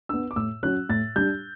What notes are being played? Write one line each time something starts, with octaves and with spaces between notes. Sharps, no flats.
B3 D4 E6
D6
A2 E6
F#3 C#4 F#6
A2 A6
G3 D4 G6